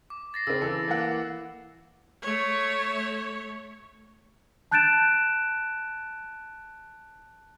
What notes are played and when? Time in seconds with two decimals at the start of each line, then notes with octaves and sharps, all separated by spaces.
0.10 D6
0.34 A6 A#6 C7
0.47 C#3 C4 E6
0.61 E3 A4
0.88 E3 A#3 F#5
2.22 A3 C#5
4.71 A5 F#6 G6 A6 D7 E7